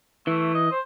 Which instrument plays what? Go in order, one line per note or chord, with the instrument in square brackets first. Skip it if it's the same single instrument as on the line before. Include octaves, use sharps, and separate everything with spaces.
[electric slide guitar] E3 [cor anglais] A3
[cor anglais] D#5
C5